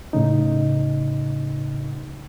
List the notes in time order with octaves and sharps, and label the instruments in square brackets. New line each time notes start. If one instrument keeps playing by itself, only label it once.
[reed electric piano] A2 C#3 D#4